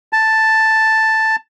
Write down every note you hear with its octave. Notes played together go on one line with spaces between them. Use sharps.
A5